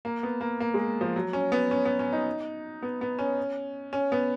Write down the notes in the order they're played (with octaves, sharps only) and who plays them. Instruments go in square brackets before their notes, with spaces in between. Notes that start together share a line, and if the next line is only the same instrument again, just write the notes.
[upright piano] A#3
B3
A#3
A#3
G#3
F3
F#3
C#4
B3
C#4
B3
C#4
D#4
B3
B3
C#4
C#4
B3